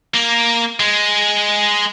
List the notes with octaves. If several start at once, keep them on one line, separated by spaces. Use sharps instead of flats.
A#3
G#3